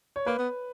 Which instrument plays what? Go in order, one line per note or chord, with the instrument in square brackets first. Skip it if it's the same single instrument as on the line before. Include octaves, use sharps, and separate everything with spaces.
[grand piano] C#5
[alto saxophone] A#3 [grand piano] B4
[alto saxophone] B3